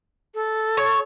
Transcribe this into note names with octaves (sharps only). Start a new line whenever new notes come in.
A4
C#5